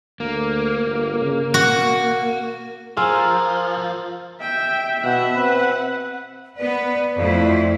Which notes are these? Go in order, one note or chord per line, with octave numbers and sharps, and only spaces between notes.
D2 A#3
G1
C#3
B2 F#4
F3 G#4 A#4 C5 C6 E6 F6
E5 G5
B2 F#5
C4 B4
B3 B4 D5
F2 A3 E4